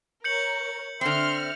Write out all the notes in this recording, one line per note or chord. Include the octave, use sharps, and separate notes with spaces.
A#4 C#5 G6 C#7 F#7
D3 C4 E5 C6 F6